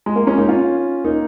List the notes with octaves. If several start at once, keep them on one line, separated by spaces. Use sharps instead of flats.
G#3
A#3
G#3 C#4
A#3 D#4
C#4 F4
A#3 D#4